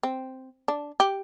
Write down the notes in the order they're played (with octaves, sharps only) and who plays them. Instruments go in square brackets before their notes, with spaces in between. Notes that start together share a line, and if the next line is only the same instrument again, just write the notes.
[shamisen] C4
D4
G4